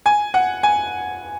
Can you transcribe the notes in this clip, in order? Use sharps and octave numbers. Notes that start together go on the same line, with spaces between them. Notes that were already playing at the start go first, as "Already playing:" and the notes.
G#5
F#5
G#5